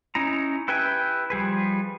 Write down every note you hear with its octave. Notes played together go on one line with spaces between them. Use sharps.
C#4 D#4 E4 A#5
E4 G4 B4 G5 G#5
F3 G3 G#4 B4